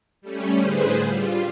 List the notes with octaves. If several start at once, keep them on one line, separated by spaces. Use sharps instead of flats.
G3 A3 C#4
A2 D3 G#4 B4 C5
G3 F4